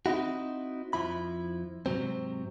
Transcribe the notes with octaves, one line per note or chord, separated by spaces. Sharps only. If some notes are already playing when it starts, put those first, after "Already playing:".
C4 D#4 E4 F#4
F2 F3 E4 B5
G#2 C3 F#3 C4